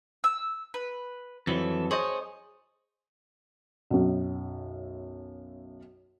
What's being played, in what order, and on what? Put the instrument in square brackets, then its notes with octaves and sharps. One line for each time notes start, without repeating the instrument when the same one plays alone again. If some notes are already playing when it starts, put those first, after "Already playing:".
[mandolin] E6
B4
[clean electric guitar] F2 E3 F#3 [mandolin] A4
[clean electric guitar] G#4 C5 D#5 [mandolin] C#5
[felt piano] B1 F#2